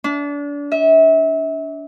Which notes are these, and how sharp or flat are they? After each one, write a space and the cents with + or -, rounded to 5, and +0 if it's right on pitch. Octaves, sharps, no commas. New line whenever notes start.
D4 -30
E5 -30